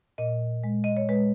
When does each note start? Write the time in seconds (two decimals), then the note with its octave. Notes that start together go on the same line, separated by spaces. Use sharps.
0.18 A#2 D#5
0.64 G#3
0.84 D#5
0.97 C#5
1.09 G#3 B4